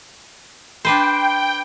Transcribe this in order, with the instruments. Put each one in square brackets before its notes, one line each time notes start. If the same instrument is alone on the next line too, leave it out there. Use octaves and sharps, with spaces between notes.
[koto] D4 B4 C5 [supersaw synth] G5